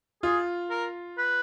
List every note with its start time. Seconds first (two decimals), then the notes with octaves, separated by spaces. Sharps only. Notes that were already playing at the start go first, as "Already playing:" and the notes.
0.23 F4 G#4
0.70 A#4
1.18 B4